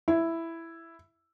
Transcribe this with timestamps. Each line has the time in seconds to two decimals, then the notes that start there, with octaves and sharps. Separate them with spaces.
0.08 E4